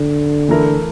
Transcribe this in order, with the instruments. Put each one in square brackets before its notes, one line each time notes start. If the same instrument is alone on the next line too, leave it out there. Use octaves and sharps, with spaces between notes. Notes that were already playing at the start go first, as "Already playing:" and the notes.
Already playing: [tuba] D3
[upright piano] E3 A3 E4 A#4